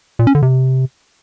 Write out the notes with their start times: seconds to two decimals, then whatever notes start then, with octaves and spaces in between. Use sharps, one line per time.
0.19 A#2
0.27 C#4
0.35 D3
0.42 C3